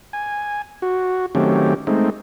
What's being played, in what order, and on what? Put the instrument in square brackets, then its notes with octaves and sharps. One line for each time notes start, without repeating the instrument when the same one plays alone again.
[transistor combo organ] G#5
F#4
D#3 F#3 A3 C4 C#4 G4
G#3 A3 C4 D#4